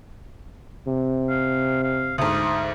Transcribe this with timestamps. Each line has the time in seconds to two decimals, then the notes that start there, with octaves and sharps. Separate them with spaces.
0.88 C3
1.29 F5
1.83 F5
2.18 D2 G#2 D#6